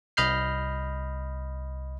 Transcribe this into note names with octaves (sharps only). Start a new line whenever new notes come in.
C2 D#5 B5 F6 G6 C7